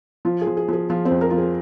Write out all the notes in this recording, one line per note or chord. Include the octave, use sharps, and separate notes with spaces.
F3 F4
G#4
F3
G#4
F3 G#4
F3 F4
C4
F2
A#4
F3 F4
G#4